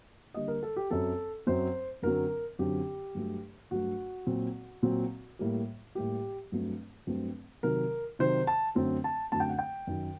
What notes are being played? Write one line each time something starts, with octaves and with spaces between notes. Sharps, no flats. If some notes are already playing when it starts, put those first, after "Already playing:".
D3 G3 A#3 D#5
A#4
A4
G4
F#2 F#3 C4 A4
F#2 F#3 C4 C5
F#2 D3 F#3 C4 A#4
F#2 D3 F#3 C4 G4
G2 F#3 A3
G2 F#3 A3 F#4
A#2 F#3 C4
A#2 F#3 C4
A2 G3 A#3
A2 G3 A#3 G4
G2 F#3 A3 C4
G2 F#3 A3 C4
C3 D#3 F#3 A#4
C3 D#3 F#3 C5
A5
F#2 D3 F#3 A3 C4
A5
F#2 D3 F#3 A3 C4 A5
G5
F#5
G5
F#2 D#3 F#3